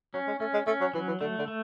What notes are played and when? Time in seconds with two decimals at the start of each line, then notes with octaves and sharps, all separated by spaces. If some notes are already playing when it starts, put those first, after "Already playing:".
0.14 F#3 C#4
0.27 G#3
0.40 A3 C#4
0.54 G#3
0.67 A3 C#4
0.80 F#3
0.93 E3 F#3
1.07 E3
1.21 D3 A3
1.39 D3
1.48 A3